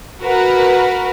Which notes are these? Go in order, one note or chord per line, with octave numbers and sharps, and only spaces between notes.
F#4 A#4 B4